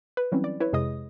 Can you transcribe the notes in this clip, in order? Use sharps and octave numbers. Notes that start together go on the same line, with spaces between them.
B4
E3 F#3 G3 C4 C#4 E4
D5
E4 B4 C#5
F2 C3 G#3 G#4 D#5 D#6